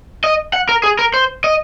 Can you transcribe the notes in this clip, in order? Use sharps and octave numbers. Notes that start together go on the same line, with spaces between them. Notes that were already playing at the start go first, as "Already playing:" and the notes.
D#5
F#5
A#4
G#4
A#4
C5
D#5